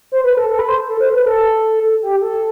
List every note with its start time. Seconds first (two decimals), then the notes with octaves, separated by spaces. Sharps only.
0.12 C5
0.24 B4
0.37 A4
0.49 A4
0.59 B4
0.69 C5
0.88 A4
1.00 C5
1.13 B4
1.26 A4
2.02 G4
2.22 A4